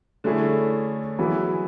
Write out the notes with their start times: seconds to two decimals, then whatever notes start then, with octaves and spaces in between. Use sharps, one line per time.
0.24 D3 A3 C#4 E4 G#4
1.18 E3 F#3 B3 E4 G#4